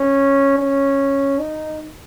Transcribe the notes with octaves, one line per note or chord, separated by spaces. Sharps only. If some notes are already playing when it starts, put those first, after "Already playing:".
Already playing: C#4
C#4
D#4